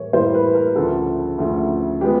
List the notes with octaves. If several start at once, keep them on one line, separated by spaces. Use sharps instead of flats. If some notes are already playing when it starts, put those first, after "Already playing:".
Already playing: A2 E3 G3 A#3 C#5
A2 E3 G3 A#3 C5
B4
A#4
D2 C#3 F3 A3 A4
D2 C#3 F3 A3
F3 G#3 B3 G4